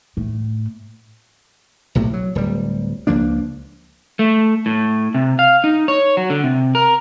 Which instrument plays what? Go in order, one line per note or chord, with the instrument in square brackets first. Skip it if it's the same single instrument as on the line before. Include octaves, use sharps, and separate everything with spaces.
[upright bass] A2
[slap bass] B1 A2 C3
F#3
D1 G3
C#2 F3 A#3 D4
[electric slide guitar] A3
A2
C3
F5
D#4
C#5
F#3
D3
C3
A#4